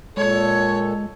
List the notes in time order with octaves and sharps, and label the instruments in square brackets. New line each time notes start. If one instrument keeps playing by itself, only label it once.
[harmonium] A#2 A4 [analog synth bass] G#3 [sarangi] C#5